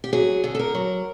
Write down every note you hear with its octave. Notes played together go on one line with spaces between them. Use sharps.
G4
F#3 G#4
D3
A4
A#4
F#3